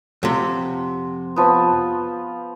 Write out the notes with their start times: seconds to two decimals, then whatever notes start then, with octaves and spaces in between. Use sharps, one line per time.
0.23 F2 C3 F#5 C6
1.36 F3 B3